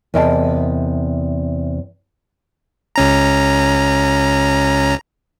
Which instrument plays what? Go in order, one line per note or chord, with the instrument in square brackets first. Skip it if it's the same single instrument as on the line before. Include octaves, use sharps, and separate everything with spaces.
[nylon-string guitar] E2 C3 A#4 D#5 G5 A5
[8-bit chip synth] C#2 C#4 A#5